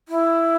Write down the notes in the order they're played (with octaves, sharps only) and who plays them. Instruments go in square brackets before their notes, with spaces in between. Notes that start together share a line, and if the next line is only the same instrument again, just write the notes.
[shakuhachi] E4